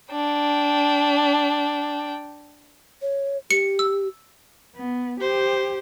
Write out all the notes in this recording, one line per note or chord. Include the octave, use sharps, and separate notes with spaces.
D4 G5
C#5
G4 C#7
E6
B3
G4 C5